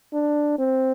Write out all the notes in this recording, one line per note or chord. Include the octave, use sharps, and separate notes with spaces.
D4
C4